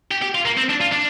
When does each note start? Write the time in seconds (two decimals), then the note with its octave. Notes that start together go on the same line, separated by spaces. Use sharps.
0.11 G4
0.22 G4
0.35 F4
0.45 A#3
0.57 C4
0.69 D4
0.81 F4
0.92 D4